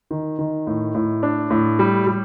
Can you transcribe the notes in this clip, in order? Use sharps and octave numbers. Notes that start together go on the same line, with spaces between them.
D#3
D#3
A2
A2
D4
A2
G3
G3